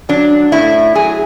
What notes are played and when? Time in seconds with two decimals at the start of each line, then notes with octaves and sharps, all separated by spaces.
0.09 F#3 D4
0.52 A2 E4
0.95 F#3 G#4